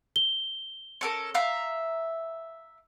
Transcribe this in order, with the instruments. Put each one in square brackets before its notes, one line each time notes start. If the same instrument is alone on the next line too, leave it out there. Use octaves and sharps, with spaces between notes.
[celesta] G7
[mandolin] C#4 A4 A#4
E5 F5 A#5